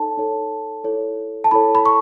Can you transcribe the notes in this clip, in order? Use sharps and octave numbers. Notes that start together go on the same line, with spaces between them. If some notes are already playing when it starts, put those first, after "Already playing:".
Already playing: D#4 A4 C#5 A5
D#4 A4 C#5
E4 A4 C#5
A5
E4 A4 C#5 B5
B5
C#6